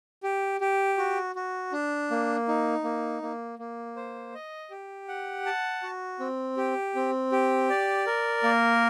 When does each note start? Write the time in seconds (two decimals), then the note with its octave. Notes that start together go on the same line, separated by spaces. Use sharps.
0.23 G4
0.61 G4
0.98 F#4
1.35 F#4
1.72 D4
2.11 A#3
2.48 D#4
2.84 A#3
3.22 A#3
3.59 A#3
3.96 C5
4.34 D#5
4.71 G4
5.08 F#5
5.46 A5
5.83 F#4
6.20 C4
6.57 G4
6.95 C4
7.32 G4
7.70 D5
8.07 A#4
8.43 A#3